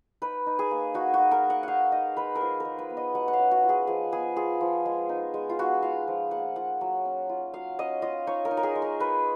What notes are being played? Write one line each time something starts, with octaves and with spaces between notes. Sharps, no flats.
D#4 B4
D#4
G#4
A#3
D#4 F#4
F#4
D#4
A#4
A#3
F#5
D#4 F5 F#5
D#4 D#5
G#3 B4
A#4
F3 G#4
A#4
G#3
B4
B3
D#5
F#3 F#5
F#5
F5
C#4
F#4
F4
G#4
F3 G#4
B3 G#4
F4 G#4
F3
G#3
D#4
G#3
F4
B3 F#4
F4 F5
F3
A#3 F#5
F4 F#5
F#3
C#4
F4
F#3 F5
C#4 D#5
F4 D#5
D#4 C#5
A#4
D#4
A#4
G#4
G#3
A#4
D#4 B4